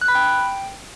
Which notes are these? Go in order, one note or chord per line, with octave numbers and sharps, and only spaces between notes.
F#6
B5
G5